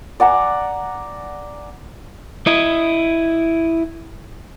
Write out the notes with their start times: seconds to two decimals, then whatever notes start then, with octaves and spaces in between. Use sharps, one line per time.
0.20 D5 F#5 G#5 A#5
2.47 E4 D#5